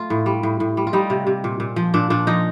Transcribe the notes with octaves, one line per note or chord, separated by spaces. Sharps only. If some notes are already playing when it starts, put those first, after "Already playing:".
Already playing: A3 F4
A2
G3
A2
A2
G3
F4
G3 D#4
C3
C3
A#2
A#2
F3
A#2 D4
A#2 D4
F3 D#4